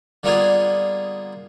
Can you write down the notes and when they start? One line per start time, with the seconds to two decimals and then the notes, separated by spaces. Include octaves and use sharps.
0.23 D3 G3 A#3 B3 F4 G#4